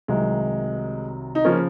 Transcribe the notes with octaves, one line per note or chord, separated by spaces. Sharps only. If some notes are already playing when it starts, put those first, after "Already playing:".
C2 C3 D#3 F#3 G#3
D#4
C#3 F3 A#3 C#4